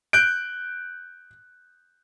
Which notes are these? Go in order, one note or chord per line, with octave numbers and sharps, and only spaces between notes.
F#6 G6 D7